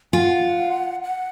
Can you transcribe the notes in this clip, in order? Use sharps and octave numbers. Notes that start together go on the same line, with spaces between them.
F4 F#5 G#5
F#5